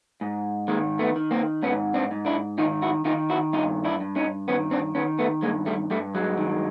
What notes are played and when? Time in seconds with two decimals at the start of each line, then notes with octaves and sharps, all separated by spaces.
0.21 G#2
0.68 D#3 G#3 A#3
0.99 A3 B3
1.16 D#3
1.31 A#3 C4
1.63 G#2 B3 C#4
1.94 C4 D4
2.11 G#2
2.26 D4 E4
2.58 D#3 D#4 F4
2.82 E4 F#4
3.05 D#3 D#4 F4
3.30 E4 F#4
3.53 G2 D#4 F4
3.85 D4 E4
4.00 G2
4.16 C#4 D#4
4.48 D#3 B3 C#4
4.71 C4 D4
4.95 D#3 B3 C#4
5.19 A3 B3
5.42 G2 G#3 A#3
5.66 G3 A3
5.91 G2 G3 A3
6.15 F#3 G#3
6.37 D#3